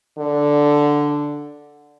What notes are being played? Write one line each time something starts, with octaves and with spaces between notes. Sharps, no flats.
D3